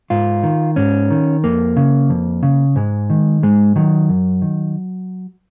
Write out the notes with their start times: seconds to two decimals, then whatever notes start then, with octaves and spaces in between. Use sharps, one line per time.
0.10 G#2 F4
0.43 D#3
0.76 G#2 C#4
1.10 D#3
1.44 F2 A#3
1.77 C#3
2.10 F2
2.43 C#3
2.76 G#2 G#3
3.10 D#3
3.43 G#2 G#3
3.76 D#3 F#3
4.09 F#2
4.42 D#3